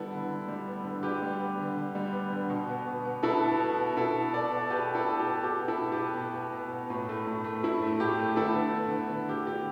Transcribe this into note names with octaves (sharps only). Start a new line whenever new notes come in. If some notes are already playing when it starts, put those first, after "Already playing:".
Already playing: D3 G3 B3 E4 A4
D3
D3
G3
B3
D3
D3 G4 B4
G3
B3
D3
D3
G3
B3
D3
B2
B3
B2
B3
B2 E4 A4
B3
B2
B3
B2 E4 A4
B3
B2 A4 D5
B3
B2 G4 B4
B3
E4 A4
B2
G4
B3
B2 G4
B3
E4 A4
B2
G4 B4
B3
B2
B3
B2
B3
A2
A3
A2
A3
A2 E4
A3
A2 G4
A3
D3 E4 A4
B3
D3
B3
D3
B3 G4
D3 G4